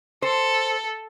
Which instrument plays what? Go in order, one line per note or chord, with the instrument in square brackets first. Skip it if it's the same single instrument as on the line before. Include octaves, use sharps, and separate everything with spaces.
[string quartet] A4 [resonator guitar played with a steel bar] C5